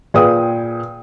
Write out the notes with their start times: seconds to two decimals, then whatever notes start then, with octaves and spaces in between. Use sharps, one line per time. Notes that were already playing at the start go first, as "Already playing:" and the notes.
0.14 A#2 G#4 B4 G5 D#6